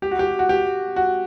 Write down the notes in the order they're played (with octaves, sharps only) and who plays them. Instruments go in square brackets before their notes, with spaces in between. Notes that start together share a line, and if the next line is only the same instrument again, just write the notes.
[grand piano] G4
F#4
G4
F#4
G4
F#4